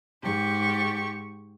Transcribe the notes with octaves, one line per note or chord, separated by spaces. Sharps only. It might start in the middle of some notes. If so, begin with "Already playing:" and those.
G#2 G4 C#6